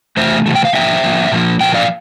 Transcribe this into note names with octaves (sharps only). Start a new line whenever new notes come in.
C3 E3 A3 C5 E5
C3 E3 A3
G5
F5
D3 F3 A#3 E5 G5
D3 F3 A#3
A#2 F3 A#3
A#2 F3 A#3 G5
D5 F5